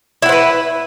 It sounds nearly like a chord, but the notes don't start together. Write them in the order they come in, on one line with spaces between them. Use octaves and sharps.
E4 F#5 C5 B4